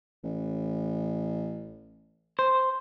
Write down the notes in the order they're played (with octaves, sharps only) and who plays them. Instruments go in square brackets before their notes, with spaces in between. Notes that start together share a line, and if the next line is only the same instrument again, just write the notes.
[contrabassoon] A1
[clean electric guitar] C5